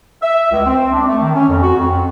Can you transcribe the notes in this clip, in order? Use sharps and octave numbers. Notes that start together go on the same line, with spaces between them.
E5
C#2
C4
D4
A3
D#3
C#4
F2
F#4
F2